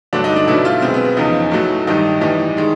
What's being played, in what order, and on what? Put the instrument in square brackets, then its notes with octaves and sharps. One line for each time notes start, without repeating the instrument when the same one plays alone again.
[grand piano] G2 D3 F#3 A3 D4
D#4
D4
B2 F#3 A3 E4
F4
B2 G#3 C4
B3
B3
E2 C#3 F3 D#4
A2 F#3 A3
G2 D#3 G3 D#4
A2 E3 G3 D#4
D#3 G#3